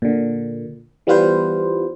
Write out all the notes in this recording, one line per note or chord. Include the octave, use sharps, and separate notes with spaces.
A#2 D3
E3 G3 B3 F4 B4 C5